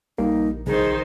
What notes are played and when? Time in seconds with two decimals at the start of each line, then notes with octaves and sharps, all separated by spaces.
0.18 A#1 G3 A#3 D#4
0.67 C2 D#3 D#4 G#4 C5